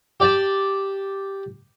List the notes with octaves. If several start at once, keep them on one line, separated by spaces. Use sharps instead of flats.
G4 D5 G5 A5